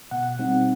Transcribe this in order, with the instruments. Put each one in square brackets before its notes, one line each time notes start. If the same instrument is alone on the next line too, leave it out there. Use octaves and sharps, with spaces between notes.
[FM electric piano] B2 F#5
G3 C4 D#4